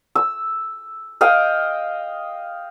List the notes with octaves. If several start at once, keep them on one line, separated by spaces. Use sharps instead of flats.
E6
D#5 F5 G5